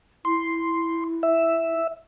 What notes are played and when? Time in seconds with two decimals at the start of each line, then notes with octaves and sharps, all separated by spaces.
0.25 E4 C6
1.23 E5